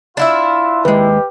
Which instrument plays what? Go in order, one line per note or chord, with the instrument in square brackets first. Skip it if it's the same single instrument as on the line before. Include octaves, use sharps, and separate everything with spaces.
[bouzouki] D4 E4 E5 [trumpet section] F4
[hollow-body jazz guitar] D#2 G#3 [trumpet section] G4 [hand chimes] B4